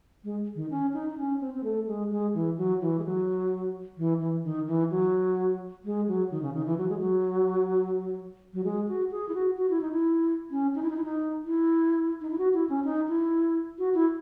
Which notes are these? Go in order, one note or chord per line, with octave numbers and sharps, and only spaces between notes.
G#3
D#3
C#4
D#4
D#4
C#4
C4
C4
A3
G#3
G#3
E3
F#3
E3
G#3
F#3
E3
E3
D#3
E3
F#3
G#3
F#3
D#3
C#3
D#3
E3
F#3
G#3
F#3
F#3
G#3
F#4
G#4
E4
F#4
F#4
E4
D#4
E4
C#4
D#4
E4
D#4
E4
D#4
E4
D#4
E4
F#4
E4
C#4
D#4
E4
F#4
E4